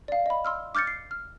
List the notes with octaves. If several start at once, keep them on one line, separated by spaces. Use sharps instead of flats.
D5 F5
D#5 B5
C6 E6 F6
D6 F6 G6 A6 C#7
C7
F6